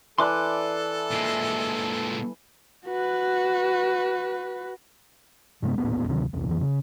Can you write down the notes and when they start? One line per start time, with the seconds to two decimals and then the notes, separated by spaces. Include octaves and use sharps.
0.18 E3 A4 D5 A5 C6 D6 F#6
1.11 A#2 G#3
2.86 F#4 B4
5.62 G2 C3 G#3 B3
5.78 D#1 A1 A#2 B3
6.07 D2 C3 D#3 F#3
6.33 E1 C2
6.47 F2 E3
6.61 C#3